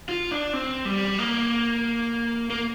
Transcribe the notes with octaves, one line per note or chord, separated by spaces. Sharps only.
F4
D4
C4
G3
A#3
A#3